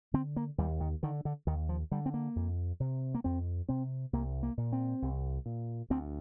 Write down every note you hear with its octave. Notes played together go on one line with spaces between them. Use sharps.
D3 C4
A#3
D#2 G3
D#3
D3 D#3
D3
D#2 D#3
F3
D3 G3
C4
A#3
F2
C3
A#3
F2 C4
C3 C4
C2 A#3
A#3
A#2
C4
C2
A#2
D2 C4